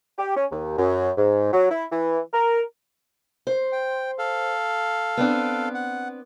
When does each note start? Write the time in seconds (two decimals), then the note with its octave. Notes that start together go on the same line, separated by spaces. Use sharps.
0.19 G4
0.37 C#4
0.51 D#2
0.78 F#2
1.18 G#2
1.53 F#3
1.71 E4
1.92 E3
2.34 A#4
3.47 C5
3.72 G5
4.18 A4 F5
5.17 B3 C4 D4
5.74 F#5